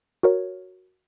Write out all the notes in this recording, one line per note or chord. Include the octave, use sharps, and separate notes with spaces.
F#4 A#4 C#5